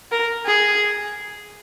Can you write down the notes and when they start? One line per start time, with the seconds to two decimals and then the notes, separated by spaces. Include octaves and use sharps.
0.11 A#4
0.46 G#4